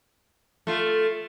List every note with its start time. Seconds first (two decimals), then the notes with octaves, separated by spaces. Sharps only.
0.67 A3 F4